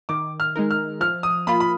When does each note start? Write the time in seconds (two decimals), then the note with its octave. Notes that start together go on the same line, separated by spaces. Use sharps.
0.09 D#3 D6
0.40 F6
0.56 G#3 D#4 A#4
0.71 F6
1.01 F3 F6
1.23 D#6
1.47 A#3 F4 B5
1.60 B5